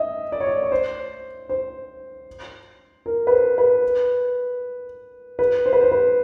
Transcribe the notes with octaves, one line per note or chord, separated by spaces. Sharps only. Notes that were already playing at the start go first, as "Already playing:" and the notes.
Already playing: D#5 E5
D5
C#5
D5
C#5
C5
C5
A#4
B4
C5
B4
B4
C5
B4
C5
B4